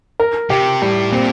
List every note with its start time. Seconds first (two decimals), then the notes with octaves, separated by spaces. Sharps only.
0.20 A#4
0.50 C3 G4
0.82 A2 G3
1.12 A#2 C4